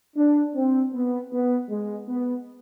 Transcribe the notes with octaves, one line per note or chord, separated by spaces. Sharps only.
D4
C4
B3
B3
G#3
B3